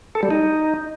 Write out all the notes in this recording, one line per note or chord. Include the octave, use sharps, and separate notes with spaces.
A4
G3
D#4